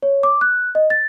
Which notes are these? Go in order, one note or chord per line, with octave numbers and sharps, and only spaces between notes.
C#5
D6
F#6
D#5
A6